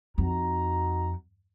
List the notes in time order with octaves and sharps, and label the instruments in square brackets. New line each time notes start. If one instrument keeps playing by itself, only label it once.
[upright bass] F2 [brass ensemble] D#4 F#4 A#5